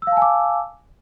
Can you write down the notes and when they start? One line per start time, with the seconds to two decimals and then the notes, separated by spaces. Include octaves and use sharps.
0.02 E6
0.07 F5
0.12 A5
0.17 G#5
0.22 D6